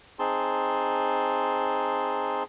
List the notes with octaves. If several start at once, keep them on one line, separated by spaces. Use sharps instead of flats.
C4 D#4 G#4 A5 C6